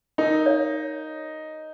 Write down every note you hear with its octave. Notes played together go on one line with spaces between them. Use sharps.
D#4 A#4
C#5 F5